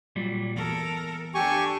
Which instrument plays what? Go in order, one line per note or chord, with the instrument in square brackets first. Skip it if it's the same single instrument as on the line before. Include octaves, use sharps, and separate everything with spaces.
[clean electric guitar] A#2 F#3 G3
[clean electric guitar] E2 [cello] A4 A#4
[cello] D4 A4 [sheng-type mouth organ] G4 G#5 C#6